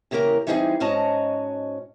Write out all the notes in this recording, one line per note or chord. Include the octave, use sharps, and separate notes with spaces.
E2 C#3 A#3 G4 A#4 A#5
E3 G3 C4 D#4 F4 G#4
G#2 C#4 F#4 D#5 A5 A#5